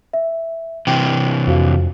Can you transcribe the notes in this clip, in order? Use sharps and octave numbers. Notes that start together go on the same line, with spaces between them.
E5
C3 E3 G5
F2 F#4 F5